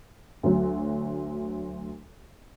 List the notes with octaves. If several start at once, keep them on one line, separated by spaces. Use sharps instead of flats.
D2 F#3